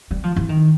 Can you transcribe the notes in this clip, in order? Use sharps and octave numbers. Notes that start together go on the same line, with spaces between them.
G3
F3
E3
D#3